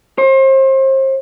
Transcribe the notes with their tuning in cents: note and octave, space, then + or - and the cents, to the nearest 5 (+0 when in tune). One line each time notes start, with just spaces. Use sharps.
C5 +35